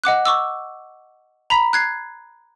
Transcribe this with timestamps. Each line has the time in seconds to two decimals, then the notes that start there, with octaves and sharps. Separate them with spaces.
0.04 D#5 F#5 D6 F#6
0.26 C#6 D6 E6
1.50 A#5 B5 B6
1.73 F#6 G#6 C7